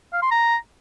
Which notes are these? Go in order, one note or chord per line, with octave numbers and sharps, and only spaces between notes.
F5
C6
A#5